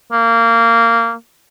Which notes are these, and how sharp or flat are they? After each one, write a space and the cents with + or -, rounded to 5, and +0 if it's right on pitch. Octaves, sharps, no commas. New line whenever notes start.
A#3 -20